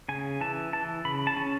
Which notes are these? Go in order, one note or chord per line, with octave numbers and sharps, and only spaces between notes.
C#3 G#5
E3 A5
E3 A5
C#3 B5
A5
C#4